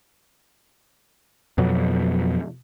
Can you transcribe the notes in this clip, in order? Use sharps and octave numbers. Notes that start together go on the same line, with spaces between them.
F2 B2 F#3